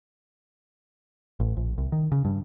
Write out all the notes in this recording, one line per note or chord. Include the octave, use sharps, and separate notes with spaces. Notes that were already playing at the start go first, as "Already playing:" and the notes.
A1
A#1
C2
D#3
C#3
G2